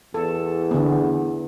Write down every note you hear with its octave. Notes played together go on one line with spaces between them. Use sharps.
E2 A4
D3 B3